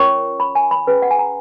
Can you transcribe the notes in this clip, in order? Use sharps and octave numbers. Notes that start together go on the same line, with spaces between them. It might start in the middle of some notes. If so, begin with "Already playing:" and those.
Already playing: C#4 F4 A#4 C#5 C#6
B5
G#5
B5
C#4 G#4 B4
F#5
G#5
A#5